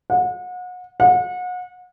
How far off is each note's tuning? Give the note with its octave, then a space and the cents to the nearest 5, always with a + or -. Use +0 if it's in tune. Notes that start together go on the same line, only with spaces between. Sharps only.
F#5 -35
F#5 -35